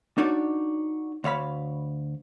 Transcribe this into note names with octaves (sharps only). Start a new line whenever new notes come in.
D4 D#4 F#4 C#5 D5
D2 C#5 F5 B5